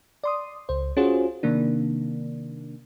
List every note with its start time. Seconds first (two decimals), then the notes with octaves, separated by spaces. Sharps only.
0.24 D5 C6 D#6
0.69 C#2 C5
0.97 C#4 F4 F#4 G#4 C5
1.43 C3 D#3 A#3 D4